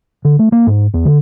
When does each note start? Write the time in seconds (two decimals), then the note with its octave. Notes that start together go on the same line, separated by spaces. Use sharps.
0.25 D3
0.39 A3
0.52 A#3
0.67 G#2
0.94 E2
1.05 D3